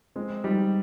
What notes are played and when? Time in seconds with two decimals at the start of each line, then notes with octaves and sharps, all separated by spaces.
0.16 G#3 C4
0.44 G3 D#4